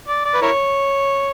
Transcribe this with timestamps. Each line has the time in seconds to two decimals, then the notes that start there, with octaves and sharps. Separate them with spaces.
0.08 D5
0.25 D5
0.34 B4
0.42 E4 A#4 C#5